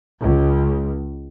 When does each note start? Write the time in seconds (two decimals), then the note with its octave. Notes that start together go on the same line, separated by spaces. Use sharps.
0.21 C#2